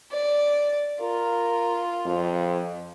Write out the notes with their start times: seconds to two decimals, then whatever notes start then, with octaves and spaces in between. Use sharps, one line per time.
0.12 D5
1.01 F4 A#4
2.06 F2